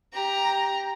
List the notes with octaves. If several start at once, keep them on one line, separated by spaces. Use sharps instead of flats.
G4 A#5